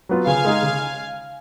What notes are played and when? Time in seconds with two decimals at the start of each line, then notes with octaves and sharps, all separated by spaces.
0.09 F#3 B3 F4
0.27 C#3 F5 G#5
0.45 G#3 D#4 G#4
0.63 C#3